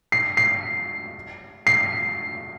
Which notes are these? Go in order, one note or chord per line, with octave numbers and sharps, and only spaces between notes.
C7
C7
C7